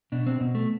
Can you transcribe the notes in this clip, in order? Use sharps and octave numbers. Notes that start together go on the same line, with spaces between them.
B2 D4
C4
B2
A3